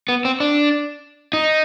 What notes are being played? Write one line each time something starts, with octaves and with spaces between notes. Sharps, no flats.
B3
C4
D4
D#4